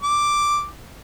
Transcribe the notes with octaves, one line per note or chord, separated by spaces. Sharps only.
D6